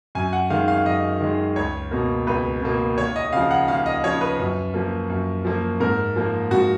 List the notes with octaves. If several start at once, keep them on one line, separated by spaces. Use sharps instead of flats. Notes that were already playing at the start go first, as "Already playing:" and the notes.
F#2 G#5
F#5
D#3 G#3 F5
F5
F#2 D#5
D#3 G#3
C#2 C#5
B2 A#3
C#2 B4
B2 A#3
D#2 C#5
D#5
C#3 F3 F5
F#5
D#2 F5
D#5
C#3 F3 C#5
B4
F#2
F3 A#3
F#2
F3 A#3
G#2 A#4
F3 A#3
G#2 F#4